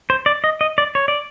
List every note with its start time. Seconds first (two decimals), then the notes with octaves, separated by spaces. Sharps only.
0.10 C5
0.26 D5
0.44 D#5
0.61 D#5
0.78 D5
0.95 C#5
1.08 D5